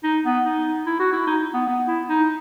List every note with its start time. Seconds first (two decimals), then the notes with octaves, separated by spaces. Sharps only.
0.04 D#4
0.25 B3
0.44 D#4
0.86 E4
0.99 F#4
1.13 E4
1.27 D#4
1.54 B3
1.67 B3
1.88 E4
2.09 D#4